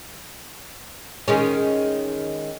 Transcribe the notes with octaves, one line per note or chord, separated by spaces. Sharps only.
D#3 G#3 C#4